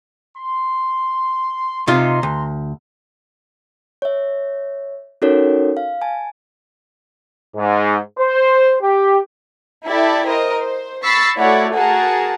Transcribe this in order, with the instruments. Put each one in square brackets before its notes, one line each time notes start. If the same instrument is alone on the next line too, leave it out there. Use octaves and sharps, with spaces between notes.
[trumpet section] C6
[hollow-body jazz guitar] C3 D#4 F4 [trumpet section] A#5 C6
[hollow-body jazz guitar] D2
[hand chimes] C#5 E5
C#4 D#4 F#4 A4 A#4 C#5
F5
G#5 A5
[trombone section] G#2
C5
G4
[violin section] E4 G4 A4 D5 E5
A#4 C5 D#5
C5
B5 C#6 E6 A6 B6 C7
A3 E4 F#4 C#5 D5
F#4 G#4 A#4 A5